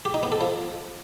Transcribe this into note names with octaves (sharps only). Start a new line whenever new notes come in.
G4
D#4
B3
A4
F3